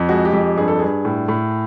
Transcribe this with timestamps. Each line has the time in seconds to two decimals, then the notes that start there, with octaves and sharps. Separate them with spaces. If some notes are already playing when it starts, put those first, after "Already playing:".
Already playing: F2
0.09 G#3 F#4
0.25 G4
0.33 F2
0.41 G4
0.57 G2 G#4
0.68 A4
0.79 G2 G#4
1.05 A2
1.28 A2